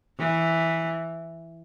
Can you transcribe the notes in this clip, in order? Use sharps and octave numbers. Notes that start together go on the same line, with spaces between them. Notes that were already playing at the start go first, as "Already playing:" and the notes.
E3